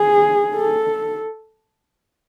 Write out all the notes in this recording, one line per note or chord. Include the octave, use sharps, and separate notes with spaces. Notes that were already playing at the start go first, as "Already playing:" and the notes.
Already playing: G#4
A4